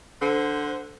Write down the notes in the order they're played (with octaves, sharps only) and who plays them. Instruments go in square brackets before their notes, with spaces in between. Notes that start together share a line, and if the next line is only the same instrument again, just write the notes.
[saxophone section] D3 C5